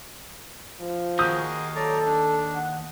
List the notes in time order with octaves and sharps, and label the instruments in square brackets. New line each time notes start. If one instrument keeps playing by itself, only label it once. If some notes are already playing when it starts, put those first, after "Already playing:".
[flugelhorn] F3
[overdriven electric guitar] D#2 [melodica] F#4 G#4 A#4 [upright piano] D#6 G6
[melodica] F#3 D5 A#5 [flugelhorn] A4
[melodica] D4
[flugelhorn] F#5